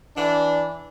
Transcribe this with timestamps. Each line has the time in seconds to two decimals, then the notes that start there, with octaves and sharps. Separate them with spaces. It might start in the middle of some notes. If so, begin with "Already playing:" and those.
0.16 E3 D4